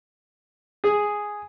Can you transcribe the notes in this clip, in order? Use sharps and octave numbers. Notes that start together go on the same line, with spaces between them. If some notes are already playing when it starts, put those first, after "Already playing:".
G#4